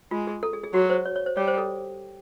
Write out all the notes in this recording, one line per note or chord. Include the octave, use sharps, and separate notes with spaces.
G#3 F4
G#4
A4
G#4
G#4
F#3 F#4
C5
C#5
C#5
C5
G3 C#5
C5
A4